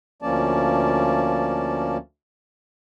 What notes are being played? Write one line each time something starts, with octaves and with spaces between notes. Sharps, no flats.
D2 F3 A#3 C#4 D5 A5